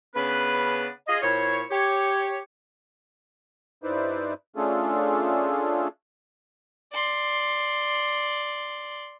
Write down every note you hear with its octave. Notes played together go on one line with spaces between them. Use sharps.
C#3 B3 C#4 D4 B4
F4 G#4 D#5
A#2 E4 C5 C#5
G4 C#5
G2 D#4 E4 B4 C5 D5
A3 C#4 D4 F4 G#4 A4
D5 C6